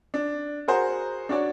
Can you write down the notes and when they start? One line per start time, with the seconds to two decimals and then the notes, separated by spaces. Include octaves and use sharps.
0.14 D4
0.68 F#4 G#4 A#4 C5 F#5
1.29 D4 F#4 C#5 D5